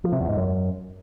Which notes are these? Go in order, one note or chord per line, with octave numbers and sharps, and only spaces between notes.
F3
C3
E2
G#2
F#2